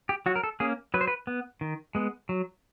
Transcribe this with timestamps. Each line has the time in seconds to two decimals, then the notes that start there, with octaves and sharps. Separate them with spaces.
0.09 G4
0.26 F#3 F#4
0.36 A#4
0.44 A4
0.60 A#3 C#4 G#4
0.94 F#3 B4
1.01 C5
1.07 B4
1.27 B3
1.61 D#3
1.95 G#3 B3
2.29 F#3